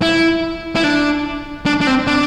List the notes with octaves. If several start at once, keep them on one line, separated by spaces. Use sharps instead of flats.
E4
E4
D4
D4
D4
C4
D4